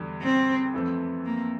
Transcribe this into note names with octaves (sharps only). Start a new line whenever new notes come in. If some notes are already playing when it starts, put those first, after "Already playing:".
Already playing: E2 D3 G3
C4
F2 E3 A3 C4
A#3